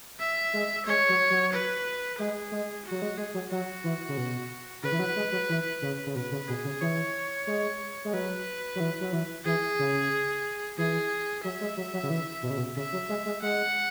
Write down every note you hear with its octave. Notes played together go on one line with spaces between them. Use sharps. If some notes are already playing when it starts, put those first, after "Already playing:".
E5
G#3
G#3 C#5
F#3
F#3
B4
G#3 G#4
G#3
F#4
F#3
G#3
G#3 G#4
F#3
F#3 F#4
E3
C#3
B2
C#3 B4
E3
F#3
G#3
F#3
E3
C#3
C#3
B2 B4
C#3
B2 G#4
C#3
E3 C#5
G#3
G#3
F#3 B4
F#3
E3
F#3
E3
E3 G#4
C#3
E3 G#4
F#3 E5
G#3
F#3
F#3
C#3
E3
B2
C#3
B2
C#3 E5
F#3
G#3
G#3
G#3 F#5